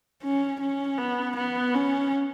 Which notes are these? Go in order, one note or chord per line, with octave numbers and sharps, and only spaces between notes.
C#4
C#4
B3
B3
C#4